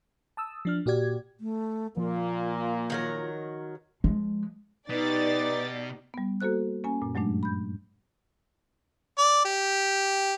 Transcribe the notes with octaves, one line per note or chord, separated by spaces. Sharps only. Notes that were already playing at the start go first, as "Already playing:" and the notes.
A5 D#6 E6
F3 D4 F6
A#2 F#4 G4 D5 G#6
A3
A#2 F3 A#3 F4
D#3 F#3 A#4
F3 G#3
B2 D#4 G4 B4 D5 A6
G3 B3
A#3 F#4 A4 C5 F#6
A#3 C#4 G#5
F#2 A#2
G2 F#3 G#3 A3 D4
B5 G6
D5
G4